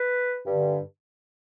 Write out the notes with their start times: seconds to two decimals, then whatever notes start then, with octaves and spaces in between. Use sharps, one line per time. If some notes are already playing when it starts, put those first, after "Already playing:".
Already playing: B4
0.46 G2 D3